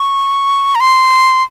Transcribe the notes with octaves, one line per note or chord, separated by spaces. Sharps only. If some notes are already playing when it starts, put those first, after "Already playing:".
Already playing: C#6
A#5
C6